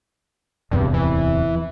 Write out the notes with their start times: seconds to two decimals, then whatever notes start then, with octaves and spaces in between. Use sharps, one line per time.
0.71 D1 E2 G2 C3
0.94 E3